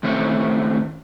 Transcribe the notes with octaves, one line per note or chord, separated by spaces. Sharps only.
A2 D#3 A3 C4 C#4 C#5